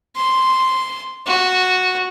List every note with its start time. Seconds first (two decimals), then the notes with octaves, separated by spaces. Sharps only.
0.16 C6
1.27 F#4